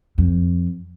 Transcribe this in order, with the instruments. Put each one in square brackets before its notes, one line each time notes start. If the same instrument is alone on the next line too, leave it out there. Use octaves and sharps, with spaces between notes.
[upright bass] F2